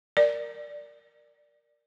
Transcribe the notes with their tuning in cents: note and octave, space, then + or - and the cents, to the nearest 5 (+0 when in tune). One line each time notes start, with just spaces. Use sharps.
A#4 +0 D5 +0